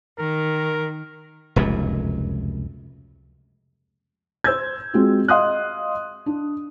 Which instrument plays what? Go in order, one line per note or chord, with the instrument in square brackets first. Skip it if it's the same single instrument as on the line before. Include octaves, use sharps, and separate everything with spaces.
[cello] D#3 [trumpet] A#4
[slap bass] F1 C#2 F#2 A#2
[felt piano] C5 E6 G6 G#6
G#3 C4 F4 F#4 G#4
D#5 F5 C6 D#6 F#6
D4